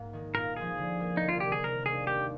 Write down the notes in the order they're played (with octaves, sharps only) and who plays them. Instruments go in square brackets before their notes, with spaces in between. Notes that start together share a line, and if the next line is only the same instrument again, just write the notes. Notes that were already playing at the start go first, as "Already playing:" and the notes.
Already playing: [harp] G#2 A#3
D#3 G#3
[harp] A#2 [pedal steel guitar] A#4
[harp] F3 G#3 D#4 [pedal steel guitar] G#4
[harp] D3
G3 A#3
[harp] C2 [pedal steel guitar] D#4
[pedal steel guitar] F4
[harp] C3 D#3 [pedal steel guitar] G4
[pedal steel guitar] G#4
[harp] C3 [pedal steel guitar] A#4
[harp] D#3 A#3 D4 [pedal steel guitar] G#4
[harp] D#2 [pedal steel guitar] G4